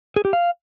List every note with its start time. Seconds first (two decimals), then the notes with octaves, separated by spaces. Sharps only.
0.16 G#4
0.25 G4
0.33 F5